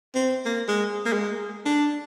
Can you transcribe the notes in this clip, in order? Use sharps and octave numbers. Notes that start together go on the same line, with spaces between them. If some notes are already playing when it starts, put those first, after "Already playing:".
C4
A#3
G#3
A#3
G#3
D4